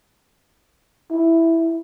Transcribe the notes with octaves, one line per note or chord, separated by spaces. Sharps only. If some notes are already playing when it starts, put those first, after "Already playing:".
E4